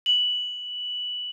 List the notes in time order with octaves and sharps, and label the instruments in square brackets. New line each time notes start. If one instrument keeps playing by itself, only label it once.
[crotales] F#7